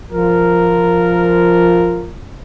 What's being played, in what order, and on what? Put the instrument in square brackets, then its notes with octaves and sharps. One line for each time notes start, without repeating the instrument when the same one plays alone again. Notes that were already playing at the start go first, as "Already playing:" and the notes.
[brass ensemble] F3 F4 A#4